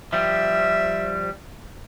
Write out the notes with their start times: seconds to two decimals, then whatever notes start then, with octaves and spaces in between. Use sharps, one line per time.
0.13 F3 G3 E5